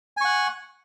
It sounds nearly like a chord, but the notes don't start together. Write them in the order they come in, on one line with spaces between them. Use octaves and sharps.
G#5 C#6 F#5